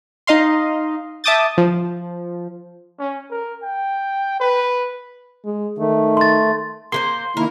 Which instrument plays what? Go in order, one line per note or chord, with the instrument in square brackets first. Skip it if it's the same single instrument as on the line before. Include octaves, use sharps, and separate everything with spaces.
[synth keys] D#4 D#5 F5 C6
E5 A5 D6 D#6 G6 A6
F3
[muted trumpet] C#4
A#4
G5
B4
[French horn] G#3
[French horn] D#3 [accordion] A3
[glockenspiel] C6 A6
[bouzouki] A#3 B4 C5 [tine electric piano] C6
[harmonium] D#3 A#3 E4 [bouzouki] A#4